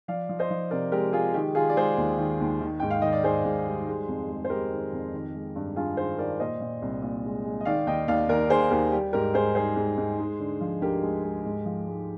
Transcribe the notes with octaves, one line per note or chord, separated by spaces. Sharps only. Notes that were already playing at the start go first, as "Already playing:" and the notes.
F3 D5 F5
F3
C5 D#5
F3
C3 A#4 D5
G#3 G4 A#4
G#3 F4 G#4
D#3 G4
D#3 F4 G#4
D5
G#3 G#4 C5
D#2
D#3
D#2
D#3
G#2 G5
F5
D#3 D#5
D5
G#2 G#4 C5
G#2
G3
G#3
F2
G#3
C5
G#3 G4 A#4
D#3
F2
D#3
G#3
G2
G2 F4 G#4
D#3 G#4 C5
D#3 A#4 D5
A#2 C5 D#5
A#2
C2
A#2
G#3
G#3
D#5
D#3 D5 F5
D#2 D#5 G5
D#2 D5 F5
D#2 A#4 D5
D#2 G#4 C5
D#2 G4 A#4
G3 G4
G#2 G4 A#4
G#2 G#4 C5
G3 G#4 C5
G#2
G#2
G#3
D3
F3
D2 G4 A#4
G#3
G#3
G#2
F3
G#3